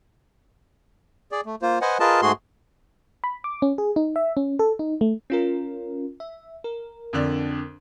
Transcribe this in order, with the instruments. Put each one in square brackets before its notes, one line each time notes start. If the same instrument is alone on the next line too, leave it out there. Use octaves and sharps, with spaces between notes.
[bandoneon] G#4 D5
A3
A#3 F4 C5
B4 C5 D#5 F#5 G#5
F4 G#4 A#4 B4 D#5 A5
G#2 A3 F#4 G#4 C6
[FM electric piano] B5
D6
C#4
G#4
D#4
E5
C#4
A4
D#4
A3
C#4 F4 A#4
E5
A#4
[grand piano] F2 D3 D4